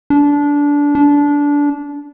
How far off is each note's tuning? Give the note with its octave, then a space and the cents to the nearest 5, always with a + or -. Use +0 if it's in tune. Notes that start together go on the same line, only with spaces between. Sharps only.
D4 -20
D4 -20